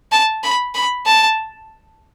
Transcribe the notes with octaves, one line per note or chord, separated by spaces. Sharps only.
A5
B5
B5
A5